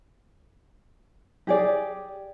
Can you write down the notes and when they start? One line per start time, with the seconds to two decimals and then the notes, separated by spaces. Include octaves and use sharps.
1.47 G4 G#4 D5